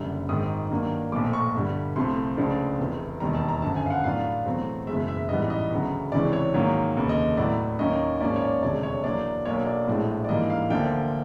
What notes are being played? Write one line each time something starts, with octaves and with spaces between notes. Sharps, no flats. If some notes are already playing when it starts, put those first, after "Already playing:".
Already playing: F#1 F#2 D3 G3
G#1 G#2 D#3 D#6
G2 D#3 F#3 A#3 D4
B1 A#2 F3 A3 D6
C#6
G1 G2 D3 G3
C2 C3 F3 A3 C4 C6
C#2 C#3 F3 A3 D4
F1 E2 C3
E1 D#2 D#3 G3 A#5
A5
A#5
G1 F#2 D3 F3 A5
G#5
F5
F#5
A2 F#3 B3 D4 F4 F5
E2 B2 F#3 A3 C4
F#1 E2 B2 G#3 E5
E5
A1 G#2 E3 G3 B3 D#5
D#5
D2 C#3 F#3 B3
C#2 C3 E3 G#3 C#4 D5
C#5
G#2 D#3 F#3 A#3 C#5
F1 D#2 C#3
D#5
A2 F#3 B3 E4 D5
D#2 D#3 F#3 A#3 C#4 D#5
G#2 F3 A#3 C#4 D5
C#5
D5
E1 D2 C3 F3 G#3 D5
C#5
E2 B2 F#3 A#3 D4 D5
B1 B2 F#3 A#3 D4 C#5
D5
A#1 A2 F3 G#3
D5
G#2 E3 G3 A#3 D4 D#5
F5
D2 D3 F3 A#3 D4 G5